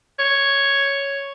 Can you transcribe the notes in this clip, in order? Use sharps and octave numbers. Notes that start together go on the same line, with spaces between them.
C#5